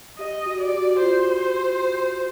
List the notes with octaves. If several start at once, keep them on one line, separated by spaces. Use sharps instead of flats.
G4 D#5
F#4
D5
G4
F#4
F4 C5